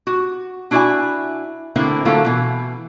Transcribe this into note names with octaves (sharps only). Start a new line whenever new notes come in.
F#4
D4 E4 F#4 D5 E5 G#5
A2 D3 A#3 C4 D4 E4
D3 F#3 A3 A#3 F4 A4
B2 E3